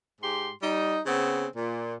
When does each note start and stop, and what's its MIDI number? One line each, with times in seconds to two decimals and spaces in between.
0.21 0.50 44
0.21 0.50 67
0.21 0.50 84
0.62 0.99 55
0.62 0.99 63
1.06 1.45 49
1.06 1.45 59
1.06 1.45 60
1.56 1.95 46